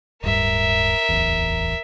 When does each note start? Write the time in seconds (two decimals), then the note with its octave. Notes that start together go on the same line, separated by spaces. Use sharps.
0.23 D1 G2 A#4 E5
1.09 D1 A1 E2